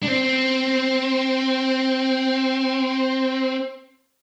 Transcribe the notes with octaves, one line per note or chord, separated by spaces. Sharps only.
D4
C4